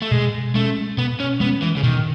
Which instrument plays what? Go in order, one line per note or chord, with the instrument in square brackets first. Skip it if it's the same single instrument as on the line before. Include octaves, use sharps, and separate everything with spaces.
[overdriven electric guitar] A3
[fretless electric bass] B2 [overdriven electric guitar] G#3
[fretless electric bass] G#3 C#4 [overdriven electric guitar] A3
[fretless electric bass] B2 [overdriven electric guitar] B3
[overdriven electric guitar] C#4
[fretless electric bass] G#3 C#4 [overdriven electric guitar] B3
[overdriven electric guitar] E3
C#3
[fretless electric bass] B2 [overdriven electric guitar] D#3